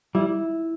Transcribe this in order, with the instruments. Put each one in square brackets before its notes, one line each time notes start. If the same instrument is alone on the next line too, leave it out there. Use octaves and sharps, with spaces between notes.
[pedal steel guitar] G3 [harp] E4